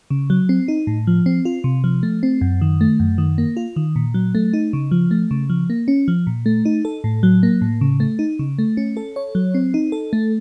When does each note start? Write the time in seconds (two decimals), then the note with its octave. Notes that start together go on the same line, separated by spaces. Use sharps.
0.10 C#3
0.30 F#3
0.49 C4
0.68 D#4
0.87 A2
1.07 F3
1.26 C4
1.45 F4
1.64 C3
1.84 F3
2.03 A3
2.23 C4
2.41 F#2
2.61 D#3
2.81 A3
3.00 F#2
3.18 D#3
3.38 A#3
3.57 F4
3.76 D#3
3.96 A#2
4.14 F#3
4.35 A3
4.53 D#4
4.73 C#3
4.91 F3
5.11 A3
5.31 C#3
5.50 F3
5.70 A#3
5.88 C#4
6.08 F3
6.27 A#2
6.46 A3
6.65 D#4
6.85 A4
7.04 A2
7.23 F#3
7.43 A#3
7.62 A2
7.81 C#3
8.00 A3
8.19 D#4
8.39 C#3
8.59 A3
8.77 C#4
8.97 A4
9.16 C#5
9.35 F#3
9.54 C4
9.74 D#4
9.92 A4
10.13 A3